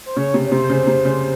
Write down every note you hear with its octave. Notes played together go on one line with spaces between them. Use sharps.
C5
C#3 C#5
C3
C#5
C3 C5
C#3
C3
C#3